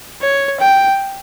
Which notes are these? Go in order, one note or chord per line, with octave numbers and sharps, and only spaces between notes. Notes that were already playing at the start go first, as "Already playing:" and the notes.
C#5
G5